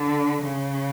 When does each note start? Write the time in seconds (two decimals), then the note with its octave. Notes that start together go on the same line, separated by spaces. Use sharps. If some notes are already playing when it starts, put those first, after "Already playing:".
Already playing: D3
0.43 C#3